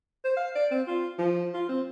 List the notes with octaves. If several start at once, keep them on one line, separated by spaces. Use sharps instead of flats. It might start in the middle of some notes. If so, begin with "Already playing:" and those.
C5
F5
D5
C4
F4
F3
F4
C4